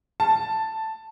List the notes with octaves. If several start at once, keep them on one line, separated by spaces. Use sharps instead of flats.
A5